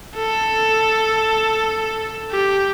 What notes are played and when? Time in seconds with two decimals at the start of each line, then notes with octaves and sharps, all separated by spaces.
0.16 A4
2.32 G4